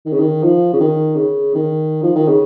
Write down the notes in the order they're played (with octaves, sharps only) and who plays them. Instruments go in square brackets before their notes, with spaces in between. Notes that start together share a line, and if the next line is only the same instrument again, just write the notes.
[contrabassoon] D#3
C#3
D#3
F3
C#3
D#3
C#3
D#3
F3
D#3
C#3